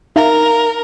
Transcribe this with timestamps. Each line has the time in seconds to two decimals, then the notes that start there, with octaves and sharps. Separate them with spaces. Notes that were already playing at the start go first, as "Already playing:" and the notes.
0.16 D#4 A#4 E5 F5